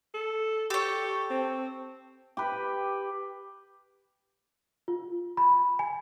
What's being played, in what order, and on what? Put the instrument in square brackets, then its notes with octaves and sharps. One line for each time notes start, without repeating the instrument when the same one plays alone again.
[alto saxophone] A4
[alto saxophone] G4 [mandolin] A4 C#5
[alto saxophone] C4
[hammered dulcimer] G4 B4
[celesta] F4
B5
G#5